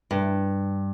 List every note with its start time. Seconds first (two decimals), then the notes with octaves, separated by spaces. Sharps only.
0.11 G2